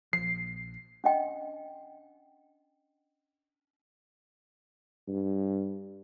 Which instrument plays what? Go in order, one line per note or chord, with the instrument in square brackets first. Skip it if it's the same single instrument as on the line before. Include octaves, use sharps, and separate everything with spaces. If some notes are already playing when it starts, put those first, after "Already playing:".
[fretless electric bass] A#1 F3 [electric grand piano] C7
[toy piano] C#4 D4 D#5 G5
[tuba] G2